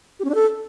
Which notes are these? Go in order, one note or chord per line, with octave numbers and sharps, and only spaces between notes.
G4
C#4
D4
A4